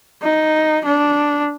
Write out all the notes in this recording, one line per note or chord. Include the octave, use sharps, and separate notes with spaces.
D#4
D4